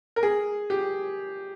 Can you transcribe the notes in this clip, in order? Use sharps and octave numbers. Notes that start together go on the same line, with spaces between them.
A#4
G#4
G4